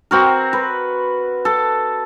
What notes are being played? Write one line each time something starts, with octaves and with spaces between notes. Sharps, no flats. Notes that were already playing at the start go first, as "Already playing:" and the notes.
C4 F#4 A#4
B4
A4